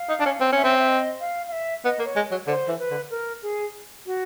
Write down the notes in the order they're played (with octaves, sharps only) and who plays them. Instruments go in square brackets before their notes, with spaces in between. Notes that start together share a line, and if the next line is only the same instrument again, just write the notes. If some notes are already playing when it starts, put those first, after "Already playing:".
Already playing: [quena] F5
[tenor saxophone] D#4
D4
C#4
C4
[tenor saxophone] C#4 [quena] E5
[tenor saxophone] C4
[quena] E5
D#5
F5
F5
E5
[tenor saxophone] B3 [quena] D#5
[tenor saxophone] A#3
[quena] C#5
[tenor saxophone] G#3
F#3
[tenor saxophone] D3 [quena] C5
[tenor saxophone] E3
[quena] B4
[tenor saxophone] D3
[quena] A#4
G#4
F#4